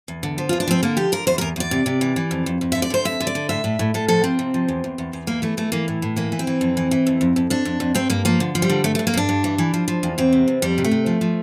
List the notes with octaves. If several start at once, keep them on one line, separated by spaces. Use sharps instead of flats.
E2
D3
F3
E2 F4
D4
F3 C4
D3 A#3
F3 G4
D3 A#4
E2 C5
E2 A#4
E2 D5
C3
C3
E3
E3
F2
F2
F2
D3 E5
D5
D3 C5
F2 E5
D3
D5
D3
A2 E5
A2
A2
A2 A4
F3 A4
F3 C4
C3
F3
E2
E2
E2
E2
E3 A#3
E3 A3
E3 A3
E3 A#3
A2
A2
E3 A#3
E3
C4
E3
F2
E3
E3
F2
F2
F2
F2 D4
F2
F2
G2 C4
G2 A#3
F3 A#3
D3
F3
G3
D3
G2 A3
G2 A3
A#3
G2 D4
G2
E3
E3
F3
F3
E2
E2 C4
C3
E2
F2 G3
C3
A3
C3
F3
F3